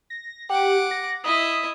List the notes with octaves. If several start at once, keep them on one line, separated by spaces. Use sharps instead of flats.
A#6
G4 F#5 D6
A#6
E4 D#5 D#6